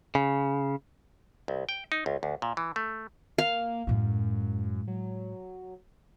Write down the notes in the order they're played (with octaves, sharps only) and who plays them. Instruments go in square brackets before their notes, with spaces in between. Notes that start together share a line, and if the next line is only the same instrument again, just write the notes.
[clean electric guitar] C#3
[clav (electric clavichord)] C2
G5
D#4
C#2
D2
A#2
E3
A3
[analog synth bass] A#3 [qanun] F5
[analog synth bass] F#2 [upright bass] A2 G#3
[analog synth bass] F#3